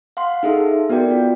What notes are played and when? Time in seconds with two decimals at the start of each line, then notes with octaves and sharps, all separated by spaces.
0.17 F5 F#5 C6
0.43 D#4 G#4 A4 E5
0.90 B3 F#4 A#4 D5 G5
1.11 F4